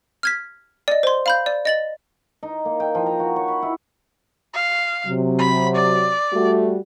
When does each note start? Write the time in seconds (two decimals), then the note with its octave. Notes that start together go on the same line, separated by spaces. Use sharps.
0.23 F6 G#6 B6
0.88 D5 D#5
1.03 C5 C6
1.26 F5 B5 G6
1.46 D5
1.65 D#5 A6 F#7
2.43 D#4
2.65 A#3
2.80 G5
2.95 F3
3.06 A#5
3.19 F#4
3.36 C#5
3.48 B5
3.62 E4
4.54 F5
5.06 C3 F#3
5.38 B5
5.75 D5
6.33 G3 A3 F#4